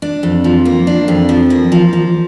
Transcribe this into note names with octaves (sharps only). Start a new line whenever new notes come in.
D4
F2
F3
A#3
D4
F2
F3
A#3
F3
F3